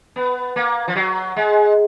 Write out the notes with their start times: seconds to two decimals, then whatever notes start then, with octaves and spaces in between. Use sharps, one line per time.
0.16 B3
0.56 A#3
0.88 F3
0.95 F#3
1.36 G#3